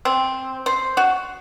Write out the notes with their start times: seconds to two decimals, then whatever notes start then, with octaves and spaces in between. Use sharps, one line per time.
0.05 C4
0.66 C5
0.97 F#4